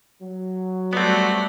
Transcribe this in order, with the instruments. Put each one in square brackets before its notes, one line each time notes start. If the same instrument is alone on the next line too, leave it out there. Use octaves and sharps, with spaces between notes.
[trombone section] F#3
[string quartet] G3 F#4 [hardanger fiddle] A3 D5 [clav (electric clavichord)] B3 C4